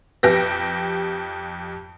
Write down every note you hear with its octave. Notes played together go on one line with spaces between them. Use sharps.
F2 G4 B4 A#6